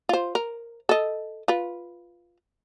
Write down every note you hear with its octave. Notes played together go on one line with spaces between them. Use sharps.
F4 C5
A#4
A4 D#5
F4 B4